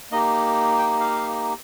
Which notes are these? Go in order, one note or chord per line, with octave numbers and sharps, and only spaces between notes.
A#3 D#4 G4 D#5
G5
F5